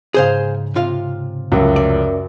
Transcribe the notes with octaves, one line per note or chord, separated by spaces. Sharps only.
G#2 C#3 G#4 C5 F5 C6
C3 F4 F5
F1 C#2 F#2 C#4 A#4 E5
D5